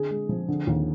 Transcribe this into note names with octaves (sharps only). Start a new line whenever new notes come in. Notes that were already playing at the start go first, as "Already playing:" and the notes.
Already playing: D3 G#4
G#3
F3
D3
D#2